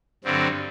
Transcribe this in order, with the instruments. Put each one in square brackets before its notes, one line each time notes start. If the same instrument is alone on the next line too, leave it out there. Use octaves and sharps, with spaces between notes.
[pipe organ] G2 D3 F#3 C4